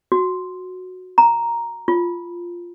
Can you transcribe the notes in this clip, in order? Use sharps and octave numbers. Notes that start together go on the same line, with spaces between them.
F#4
A#5
F4